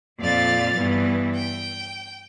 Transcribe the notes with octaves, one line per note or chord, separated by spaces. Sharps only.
F2 A#2 D5 F5 A6
G2 E3 B3
G5